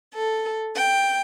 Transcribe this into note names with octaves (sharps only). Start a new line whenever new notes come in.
A4
G5